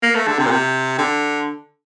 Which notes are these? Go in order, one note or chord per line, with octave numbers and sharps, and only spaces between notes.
A#3
A3
D3
C3
A#2
C3
D3